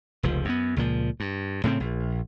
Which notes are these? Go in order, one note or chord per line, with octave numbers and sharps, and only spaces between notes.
F1 C#2 F3
F#2 B3
C#2 A#2 F3
G2
A2 C#3 F#3 C4
A#1